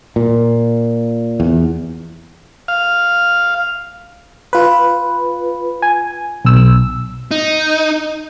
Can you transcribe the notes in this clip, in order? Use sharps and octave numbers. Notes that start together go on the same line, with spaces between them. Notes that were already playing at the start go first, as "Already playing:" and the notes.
A#2
E2
F5
F4 B4
G#5
B1 E6
D#4